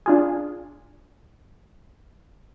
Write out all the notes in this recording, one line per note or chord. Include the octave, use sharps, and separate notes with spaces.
D4 F4 G#4